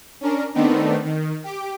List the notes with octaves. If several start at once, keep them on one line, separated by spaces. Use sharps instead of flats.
C#4 D4 A#4
D#3 A3 B3 C4 D4 D#4
D#3
G4 D6